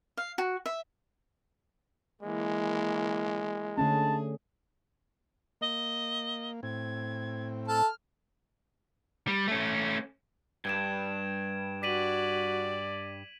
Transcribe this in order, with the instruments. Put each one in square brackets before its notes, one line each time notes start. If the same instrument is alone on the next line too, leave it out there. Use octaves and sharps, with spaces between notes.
[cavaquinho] F5
F#4
E5
[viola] E3 A#3 [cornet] G#3
[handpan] D3 A3 C#4 [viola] G#4 [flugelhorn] A5
[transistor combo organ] A#3 [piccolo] D#5
[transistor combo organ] A2 C4 [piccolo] G#6
[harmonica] A4 A5 [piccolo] F6
[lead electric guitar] G3
A3 C#4
[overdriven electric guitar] G2 [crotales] G#6 D7 E7
[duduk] F#4 [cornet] D5 [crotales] B6 D#7 F#7